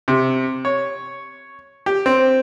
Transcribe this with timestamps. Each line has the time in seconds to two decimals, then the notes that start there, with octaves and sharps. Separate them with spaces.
0.08 C3
0.65 C#5
1.86 G4
2.06 C4